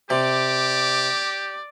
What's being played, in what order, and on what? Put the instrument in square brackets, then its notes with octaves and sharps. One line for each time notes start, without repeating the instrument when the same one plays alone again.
[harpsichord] C3 [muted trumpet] G4 [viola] D5